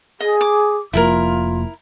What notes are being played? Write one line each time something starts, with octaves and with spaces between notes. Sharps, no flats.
G#4 D#5
D6
F1 F3 A#3 E4 F4 A4 A#4